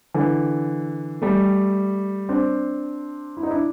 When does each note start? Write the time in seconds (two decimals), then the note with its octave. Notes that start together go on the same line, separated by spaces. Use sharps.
0.14 D3 E3
1.22 G3 A3
2.29 C4 D4
3.37 E4
3.43 D#4
3.51 D4 E4